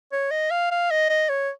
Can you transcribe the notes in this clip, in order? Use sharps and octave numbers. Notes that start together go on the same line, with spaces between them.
C#5
D#5
F5
F5
D#5
D#5
C#5